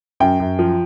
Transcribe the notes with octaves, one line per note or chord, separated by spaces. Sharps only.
F#2 G5
F#2
F3